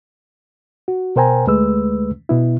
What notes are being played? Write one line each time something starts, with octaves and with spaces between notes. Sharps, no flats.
F#4
B2 A#4 C5 G5 G#5 A#5
D2 G#3 A3 B4 E6
B2 B3 E4